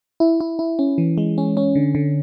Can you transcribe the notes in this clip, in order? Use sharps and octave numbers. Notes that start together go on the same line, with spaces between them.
E4
E4
E4
C#4
E3
G#3
C#4
C#4
D3
D3